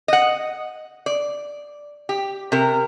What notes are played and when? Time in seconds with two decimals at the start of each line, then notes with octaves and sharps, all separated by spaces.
0.08 D#5 F#5
1.06 D5
2.09 G4
2.52 C3 A#4